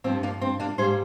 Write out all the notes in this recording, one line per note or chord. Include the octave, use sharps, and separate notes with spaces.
G2 F3 A#3 C4
A#3 D4
C4
A#3 D4
G#2 G3 A#3 G#4 C5